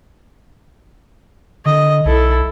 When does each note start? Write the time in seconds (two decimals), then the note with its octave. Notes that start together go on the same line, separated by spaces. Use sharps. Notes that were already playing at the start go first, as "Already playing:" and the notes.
1.66 D3 D#5
2.05 B1 E4 A4